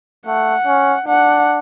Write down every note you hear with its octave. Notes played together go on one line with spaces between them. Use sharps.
A3 F#5
C#4
D4 F#5